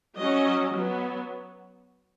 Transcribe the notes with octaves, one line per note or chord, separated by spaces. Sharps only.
F#3 C#4 D#5
F#3 B3